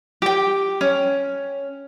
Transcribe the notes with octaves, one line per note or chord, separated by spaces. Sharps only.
G4 G5
C#4